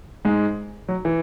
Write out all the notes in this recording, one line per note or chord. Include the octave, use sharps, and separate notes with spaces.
G#2 G#3
F#3
E3